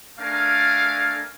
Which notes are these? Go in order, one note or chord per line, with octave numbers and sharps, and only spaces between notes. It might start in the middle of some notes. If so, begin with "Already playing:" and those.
A3 D4 A#4 F5 G#5